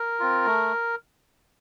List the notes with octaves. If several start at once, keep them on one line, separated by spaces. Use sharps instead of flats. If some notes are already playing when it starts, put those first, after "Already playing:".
Already playing: A#4
C4 F4
A3